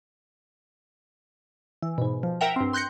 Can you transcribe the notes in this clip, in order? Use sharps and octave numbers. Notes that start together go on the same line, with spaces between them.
E3
G#2 B2
F3
A#4 E5 F#5 G5 A#5
G2 C4
C6 F#6 G6 A#6 C#7